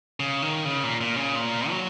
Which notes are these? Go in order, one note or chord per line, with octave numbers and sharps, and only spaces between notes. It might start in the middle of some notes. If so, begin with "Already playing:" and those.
C#3
D#3
C#3
A#2
A#2
C#3
A#2
F#3